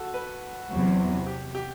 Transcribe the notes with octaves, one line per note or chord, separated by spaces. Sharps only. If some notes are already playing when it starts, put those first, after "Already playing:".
Already playing: F#4 A4
B4
E2 C3 F#3 F#4
G4
G4